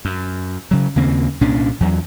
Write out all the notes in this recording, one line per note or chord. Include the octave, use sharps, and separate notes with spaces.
F#2
C#3 F#3
D#2 C#3 A#3 C4
C2 A#2 C#4 D4
E2 F#3